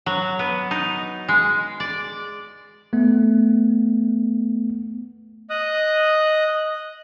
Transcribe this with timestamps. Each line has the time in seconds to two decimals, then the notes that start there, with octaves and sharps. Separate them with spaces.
0.06 F#3
0.39 B3
0.71 D#4
1.29 G#3
1.80 D5
2.93 A3 B3
5.50 D#5 D#6 F#6